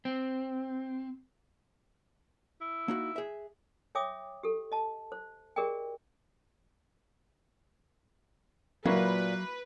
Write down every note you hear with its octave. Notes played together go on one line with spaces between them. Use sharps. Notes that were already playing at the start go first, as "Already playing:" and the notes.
C4
E4
A#3 D#4 F#4
G#4 E5
C#5 E5 G5 D6 D#6
G4 A4
D#5 A5
C5
G4 G#4 A#4 D5 D#5 G5
A#2 F#3 A#3 E4 F#4 B4